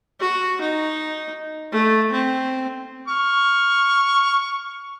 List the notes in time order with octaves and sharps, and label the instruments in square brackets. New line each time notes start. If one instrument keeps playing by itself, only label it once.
[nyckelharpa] F#4
D#4
A3
C4
[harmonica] C#6 F6